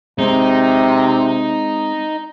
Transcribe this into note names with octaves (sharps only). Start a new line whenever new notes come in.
C3 G#3 C4 D#4